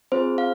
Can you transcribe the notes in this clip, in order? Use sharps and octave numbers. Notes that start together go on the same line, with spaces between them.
C4 F4 G#4 C5
F5